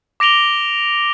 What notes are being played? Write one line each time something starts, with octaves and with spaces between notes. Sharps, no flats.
D6 A#6 D7 F7 G7